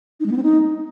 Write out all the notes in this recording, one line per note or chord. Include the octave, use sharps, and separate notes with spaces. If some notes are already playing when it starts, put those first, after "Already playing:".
D#4
G#3
B3
C4
D#4